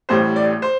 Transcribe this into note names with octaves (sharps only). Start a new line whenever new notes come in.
A1 A2 G3 C5
D5
C5